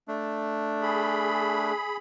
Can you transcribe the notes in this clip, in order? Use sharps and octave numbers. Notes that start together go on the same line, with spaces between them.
A3 D4
G#4 B5